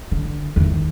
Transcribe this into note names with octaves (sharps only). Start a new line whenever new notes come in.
D3
E2 D#3